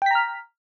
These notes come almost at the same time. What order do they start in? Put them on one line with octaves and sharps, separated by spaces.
G5 B6 A#5 F6